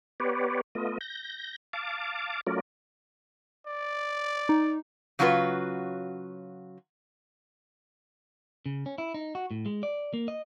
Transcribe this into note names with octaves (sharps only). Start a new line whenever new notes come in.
B3 G4 B4 C#5 D5
A3 B3 F4 D#5
G6 A#6
F5 A5 D6
F#3 A3 C#4 F4 A#4 D5
D5
D#4
C#3 F#3 C#4 F4 F#4 B4
C#3
C#4
E4
D#4
F#4
A2
G#3
D5
A#3
D#5